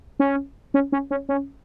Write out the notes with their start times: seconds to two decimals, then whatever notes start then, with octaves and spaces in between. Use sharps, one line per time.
0.20 C#4
0.74 C#4
0.92 C#4
1.11 C#4
1.29 C#4